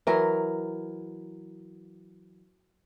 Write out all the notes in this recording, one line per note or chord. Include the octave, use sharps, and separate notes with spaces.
E3 F#3 A#4